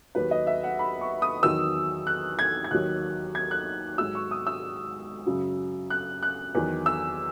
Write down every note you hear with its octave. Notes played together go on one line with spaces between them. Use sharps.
D#2 D#3 F#3 B4
D#5
E5
F#5
B5
C#6
D#6
E2 D#3 F#3 E6
F#6
G#6
G#6
D#2 D#3 F#3 F#6
G#6
F#6
G#2 F#3 E6
C#6
D#6
E6
F#2 C#3 F#3
F#6
F#6
E2 D#3 F#3
E6